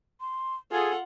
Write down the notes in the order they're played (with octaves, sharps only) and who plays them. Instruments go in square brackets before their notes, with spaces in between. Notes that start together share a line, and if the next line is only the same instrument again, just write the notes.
[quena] C6
[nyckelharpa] F4 F#5 [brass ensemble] G#4 [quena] A4